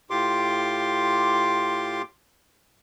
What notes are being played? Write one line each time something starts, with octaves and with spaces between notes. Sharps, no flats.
A2 F4 G4 C6 D6